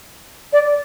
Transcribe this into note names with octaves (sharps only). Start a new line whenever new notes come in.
D5